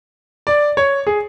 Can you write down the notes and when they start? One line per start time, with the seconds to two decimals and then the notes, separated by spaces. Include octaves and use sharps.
0.47 D5
0.77 C#5
1.07 G#4